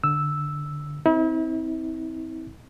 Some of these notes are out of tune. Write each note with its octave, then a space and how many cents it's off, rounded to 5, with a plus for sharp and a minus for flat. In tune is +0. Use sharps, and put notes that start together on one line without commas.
D3 +0 E6 +0
C4 +0 E4 -40